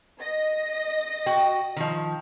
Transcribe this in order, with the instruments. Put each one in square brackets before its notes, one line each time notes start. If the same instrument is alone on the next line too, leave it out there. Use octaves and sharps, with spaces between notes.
[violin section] D#5 A#6
[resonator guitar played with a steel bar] F#4 G5
D#3 F3